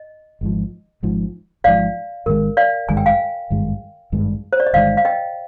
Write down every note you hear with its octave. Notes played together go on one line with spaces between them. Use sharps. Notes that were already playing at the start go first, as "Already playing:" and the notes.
Already playing: D#5
G#1 G#2 F3
G#1 G#2 F3
G#1 G#2 F3 D5 F5
G#1 G2 D#3 G#3 A#4
D5 F5
G#1 G2 D#3 G#3 G#5
G5
F5 G#5
G#1 G2 D#3 G#3
G#1 G2 D#3 G#3
C5
D5
D#5
G1 G2 D#3 G#3 D5 F5
F5
D#5 G5